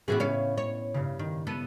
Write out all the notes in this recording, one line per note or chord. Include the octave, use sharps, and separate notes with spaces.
A2 E3 B3 C#4 F#4 G#4
C#3 C#5 F5
C#5
G2 C#3
D#3
B3 A4 D#7